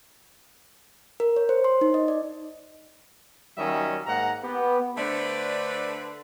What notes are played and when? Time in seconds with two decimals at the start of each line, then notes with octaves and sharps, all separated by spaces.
1.20 A#4
1.36 C#5
1.49 C5
1.64 C6
1.81 D#4
1.94 D#5
2.08 D5
3.58 D#3 F#3 G3 C#4 D#5 E5
4.07 G#2 G#3 A#3 F#5 A#5
4.44 B3 G4
4.97 D3 A3 D4 B4 C5 D5